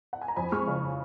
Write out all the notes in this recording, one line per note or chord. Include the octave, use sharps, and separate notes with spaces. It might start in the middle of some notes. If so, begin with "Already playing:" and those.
F#5
G#5
A#5
F2 G#5 B5
G#3 C#6 F6
C#3